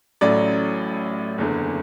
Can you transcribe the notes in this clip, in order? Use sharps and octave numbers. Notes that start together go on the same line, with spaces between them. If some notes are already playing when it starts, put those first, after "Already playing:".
A1 A2 F#3 C#4 D5
F#1 E2 D3